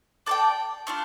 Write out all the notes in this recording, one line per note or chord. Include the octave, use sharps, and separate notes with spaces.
D4 A4 D5 G5
A3 D4 F4